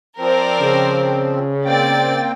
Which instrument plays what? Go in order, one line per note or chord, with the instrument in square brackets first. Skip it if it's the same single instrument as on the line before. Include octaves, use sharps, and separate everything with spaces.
[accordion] F3 C4 [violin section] A#4 C5 D5
[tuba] C#3
[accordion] A#3 C4 G5 [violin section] D5 A6